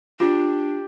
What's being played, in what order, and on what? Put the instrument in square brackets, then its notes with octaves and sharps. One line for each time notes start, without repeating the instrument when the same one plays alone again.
[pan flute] D4 [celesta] F4 [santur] G4 D5